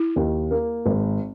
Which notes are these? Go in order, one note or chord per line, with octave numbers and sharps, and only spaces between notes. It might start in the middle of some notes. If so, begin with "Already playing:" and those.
Already playing: E4
D#2
A#3
G#1